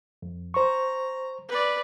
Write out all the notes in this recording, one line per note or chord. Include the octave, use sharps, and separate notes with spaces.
F2
C5 A#5 C#6
B4 D5